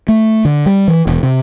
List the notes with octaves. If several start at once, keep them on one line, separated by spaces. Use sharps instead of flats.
A3
D3
G3
E3
E1
C3